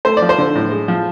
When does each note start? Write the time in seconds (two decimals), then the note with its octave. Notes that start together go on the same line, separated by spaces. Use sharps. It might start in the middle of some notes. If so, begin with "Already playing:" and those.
0.05 A3 C5
0.17 F3 D5
0.29 C5
0.38 D3
0.55 A2
0.72 G#3
0.88 F3